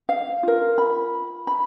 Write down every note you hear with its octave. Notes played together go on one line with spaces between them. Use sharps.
F5
F4 A#4
B5
B5